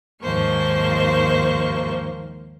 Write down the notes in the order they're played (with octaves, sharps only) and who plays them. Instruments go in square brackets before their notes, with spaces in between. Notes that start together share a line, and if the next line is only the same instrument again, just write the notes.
[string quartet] D#2 G#2 F3 A#3 C5 C#6